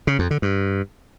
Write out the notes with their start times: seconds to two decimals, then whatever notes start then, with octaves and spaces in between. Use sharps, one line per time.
0.07 C#3
0.19 F2
0.31 D3
0.42 G2